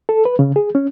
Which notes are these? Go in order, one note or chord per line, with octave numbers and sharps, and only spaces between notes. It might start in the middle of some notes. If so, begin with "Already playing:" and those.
A4
B4
C#3
G#4
C#4